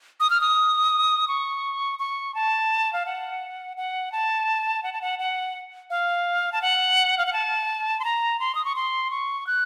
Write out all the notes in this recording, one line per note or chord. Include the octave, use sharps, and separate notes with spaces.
D#6
F6
D#6
C#6
C#6
A5
F5
F#5
F#5
A5
F#5
A5
F#5
F#5
F5
A5
F#5
F5
F#5
A5
C6
A#5
C6
D#6
C#6
C6
C#6
F#6